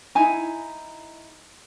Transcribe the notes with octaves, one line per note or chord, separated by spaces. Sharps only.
D#4 E4 G#5 A#5